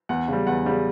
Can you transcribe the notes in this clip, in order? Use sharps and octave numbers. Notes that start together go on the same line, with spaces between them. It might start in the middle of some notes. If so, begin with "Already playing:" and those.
E2 F#5
C#3 G3
E2 F#5
C#3 G3